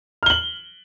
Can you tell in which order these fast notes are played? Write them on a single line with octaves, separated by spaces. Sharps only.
F6 G7 F#7